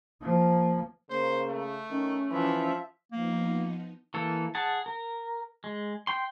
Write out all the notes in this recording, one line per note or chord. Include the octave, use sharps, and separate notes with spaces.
F3 A#3
C#3 A#3 C5
A3
D#3 C#4
E3 F3 E5
F3 A#3 B3 D#4
E3 A#3 A4
G#4 F#5 A5
A#4
G#3
G5 C6